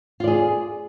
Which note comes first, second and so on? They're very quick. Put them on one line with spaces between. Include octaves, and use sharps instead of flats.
F4 D5 G#4